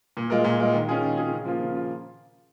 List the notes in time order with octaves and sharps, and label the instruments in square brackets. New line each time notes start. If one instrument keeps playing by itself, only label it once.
[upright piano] A#2
G#3 F4 A#4
A#2
G#3 F4 A#4
D#3
C#4 F4 G#4
D#3
C#4 F4 G#4
C#3
F3 A#3 F4
C#3
F4